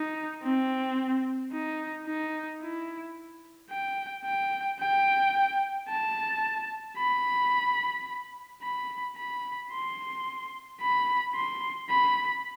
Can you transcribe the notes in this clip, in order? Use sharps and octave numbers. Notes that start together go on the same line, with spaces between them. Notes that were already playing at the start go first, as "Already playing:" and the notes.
Already playing: D#4
C4
D#4
D#4
E4
G5
G5
G5
A5
B5
B5
B5
C6
B5
C6
B5